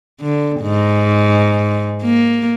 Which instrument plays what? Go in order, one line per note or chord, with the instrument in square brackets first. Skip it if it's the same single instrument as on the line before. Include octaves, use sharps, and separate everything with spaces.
[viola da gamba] D3
G#2
A#3